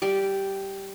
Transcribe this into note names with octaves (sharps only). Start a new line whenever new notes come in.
G3 G4 D5